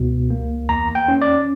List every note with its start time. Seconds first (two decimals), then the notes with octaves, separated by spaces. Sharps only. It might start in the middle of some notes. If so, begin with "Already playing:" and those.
Already playing: C#2 B2
0.30 A#3
0.69 E2 A#5
0.95 G5
1.08 C#4
1.22 D5